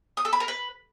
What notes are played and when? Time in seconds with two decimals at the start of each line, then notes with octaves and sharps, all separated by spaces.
0.17 D#6
0.25 A4
0.33 B5
0.40 A#4
0.48 B4